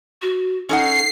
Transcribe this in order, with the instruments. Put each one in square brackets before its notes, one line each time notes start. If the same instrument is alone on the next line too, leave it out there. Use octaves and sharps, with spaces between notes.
[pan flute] F#4
[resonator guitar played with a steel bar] C#4 D#4 F#5 [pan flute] A4 [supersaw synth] C7